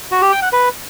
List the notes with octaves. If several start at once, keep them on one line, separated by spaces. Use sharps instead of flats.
F#4
G4
G5
F#5
B4